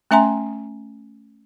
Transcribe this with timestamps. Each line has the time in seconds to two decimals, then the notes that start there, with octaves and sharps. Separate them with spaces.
0.11 A3 C#4 E5 G#5 A#5 C6